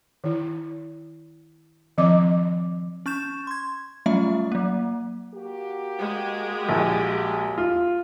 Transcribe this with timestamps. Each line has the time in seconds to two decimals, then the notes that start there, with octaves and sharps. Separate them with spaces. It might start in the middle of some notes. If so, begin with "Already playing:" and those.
0.24 D#3 E4
1.98 D#3 F3 C4 D#5 D6
3.06 C#4 C#6 G6 E7
3.47 C6 G#6
4.06 F#3 G3 A3 C#4 F4 E5
4.52 F#3 A#3
5.34 A#3 F#4 G4
6.00 G#3
6.69 A#1
7.58 F4